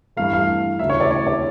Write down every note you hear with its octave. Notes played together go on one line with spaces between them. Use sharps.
G2 E3 A3 F5
F5
D2 C#3 E3 A3 E5
C#5
D5
C#5
D5